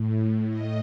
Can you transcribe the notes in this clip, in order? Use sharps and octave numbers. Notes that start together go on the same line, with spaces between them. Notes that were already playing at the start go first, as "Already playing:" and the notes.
Already playing: A2
D#5